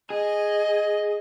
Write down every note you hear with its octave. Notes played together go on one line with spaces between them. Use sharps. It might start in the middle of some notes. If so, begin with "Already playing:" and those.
G#4 D#5